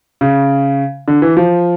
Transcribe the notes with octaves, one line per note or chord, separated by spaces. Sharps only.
C#3
D3
E3
F3